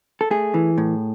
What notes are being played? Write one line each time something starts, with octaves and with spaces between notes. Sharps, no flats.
A4
A3 G#4
E3
A2